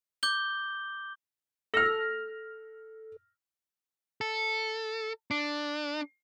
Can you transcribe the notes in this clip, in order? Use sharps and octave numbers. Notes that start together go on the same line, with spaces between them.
D6 G6 G7
A4 F6 A#6
A4
D4